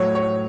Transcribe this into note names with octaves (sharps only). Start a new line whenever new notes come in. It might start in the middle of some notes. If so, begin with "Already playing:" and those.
Already playing: A2 F#3 C#5
C#5